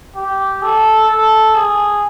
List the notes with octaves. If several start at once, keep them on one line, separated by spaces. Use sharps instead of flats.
G4
A4
A4
G#4